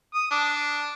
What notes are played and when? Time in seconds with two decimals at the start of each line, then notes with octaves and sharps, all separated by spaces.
0.14 D#6
0.31 D4